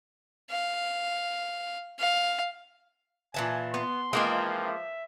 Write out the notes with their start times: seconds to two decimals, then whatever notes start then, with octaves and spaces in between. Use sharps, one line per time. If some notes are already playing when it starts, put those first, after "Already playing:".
0.50 F5
1.99 F5
3.34 A#2 E3 G#5 A5
3.74 B3 C6
4.13 E3 F3 G#3 A#3 C4 D#4 F4
4.63 E5